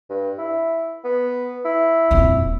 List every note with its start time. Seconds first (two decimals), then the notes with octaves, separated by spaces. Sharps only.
0.10 G2
0.38 E4
1.04 B3
1.64 E4
2.11 D#1 F2